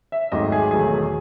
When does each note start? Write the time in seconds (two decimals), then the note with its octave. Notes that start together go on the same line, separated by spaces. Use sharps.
0.12 E5
0.32 G#1 G#2 F#3 A3 D#5
0.52 G#4
0.71 E1 E2 D#3 F#3 A3 G#4